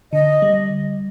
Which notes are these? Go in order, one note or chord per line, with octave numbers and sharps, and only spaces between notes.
D3 D#5
G3